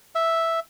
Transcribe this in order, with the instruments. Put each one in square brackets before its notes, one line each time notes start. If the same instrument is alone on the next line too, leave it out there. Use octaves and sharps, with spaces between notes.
[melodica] E5